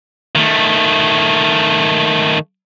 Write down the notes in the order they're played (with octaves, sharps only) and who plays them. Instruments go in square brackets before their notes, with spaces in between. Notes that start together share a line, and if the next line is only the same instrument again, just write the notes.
[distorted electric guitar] D#3 A3